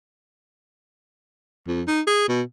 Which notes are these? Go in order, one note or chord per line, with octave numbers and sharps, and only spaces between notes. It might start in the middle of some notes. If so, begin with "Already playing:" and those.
F2
D#4
G#4
B2